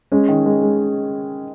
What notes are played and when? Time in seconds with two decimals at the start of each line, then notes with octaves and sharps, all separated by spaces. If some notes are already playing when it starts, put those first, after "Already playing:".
0.12 G#3 C#4
0.29 D#3
0.46 G#3
0.62 G#3